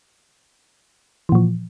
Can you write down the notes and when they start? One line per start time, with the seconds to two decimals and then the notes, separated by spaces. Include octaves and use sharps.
1.29 E3
1.32 A#2
1.35 F3